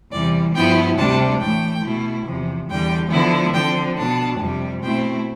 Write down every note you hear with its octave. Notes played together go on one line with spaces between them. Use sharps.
E2 C3 E3 G3 D5
G2 F3 B3 E4 G5
D2 C3 G3 D4 A5
A2 E3 A3 G5
B2 A3 E4
E2 C3 F3
E2 D3 G3 G5
D3 F3 B3 E4
D3 F3 C4 G5
B2 B3 D4 A5
F2 C3 G3
B2 A3 C4 E4 G5